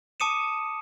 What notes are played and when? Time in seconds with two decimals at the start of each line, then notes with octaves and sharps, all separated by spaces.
0.20 A5 D6 D#6 C#7 D#7 E7